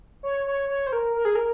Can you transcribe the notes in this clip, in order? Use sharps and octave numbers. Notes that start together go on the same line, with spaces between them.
C#5
C#5
C#5
C5
A#4
A#4
G#4
A#4